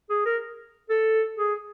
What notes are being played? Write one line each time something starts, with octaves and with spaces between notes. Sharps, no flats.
G#4
A#4
A4
G#4